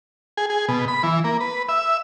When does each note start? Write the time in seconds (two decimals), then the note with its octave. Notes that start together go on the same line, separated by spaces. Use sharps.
0.37 G#4
0.50 G#4
0.68 B2
0.88 B5
1.03 E3
1.24 A#3
1.40 B4
1.69 E5